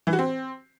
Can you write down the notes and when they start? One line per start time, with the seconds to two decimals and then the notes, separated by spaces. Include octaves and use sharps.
0.07 E3
0.13 F#4
0.19 C4